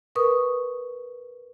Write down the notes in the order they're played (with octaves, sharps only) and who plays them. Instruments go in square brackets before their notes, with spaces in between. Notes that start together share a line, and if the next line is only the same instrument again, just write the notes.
[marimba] A#4 B4 C#6 D#6